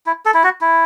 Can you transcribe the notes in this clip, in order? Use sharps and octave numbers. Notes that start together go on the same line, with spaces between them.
E4
A4
E4
F#4
E4